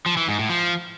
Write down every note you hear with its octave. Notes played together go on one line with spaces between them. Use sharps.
F3
E3
G#2
A2
F3